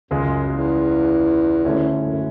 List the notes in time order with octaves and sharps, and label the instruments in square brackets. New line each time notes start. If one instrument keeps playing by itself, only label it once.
[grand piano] C#2 C#3 G#3 [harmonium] F#2
[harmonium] E2
[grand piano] D2 D3 A3 C#4 E4
[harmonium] G#2
F#2